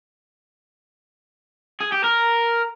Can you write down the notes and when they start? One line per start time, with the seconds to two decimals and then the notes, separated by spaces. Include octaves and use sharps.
1.80 G#4
1.92 G4
2.04 A#4